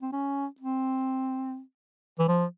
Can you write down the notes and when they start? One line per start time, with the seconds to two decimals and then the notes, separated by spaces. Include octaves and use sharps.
0.02 C4
0.12 C#4
0.60 C4
2.19 E3
2.28 F3